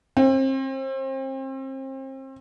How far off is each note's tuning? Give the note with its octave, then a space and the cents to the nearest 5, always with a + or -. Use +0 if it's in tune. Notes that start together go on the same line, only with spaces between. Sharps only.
C4 +35